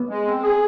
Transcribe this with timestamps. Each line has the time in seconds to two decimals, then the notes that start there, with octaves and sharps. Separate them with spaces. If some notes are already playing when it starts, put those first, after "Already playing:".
Already playing: B3
0.09 G#3
0.26 C4
0.43 G#4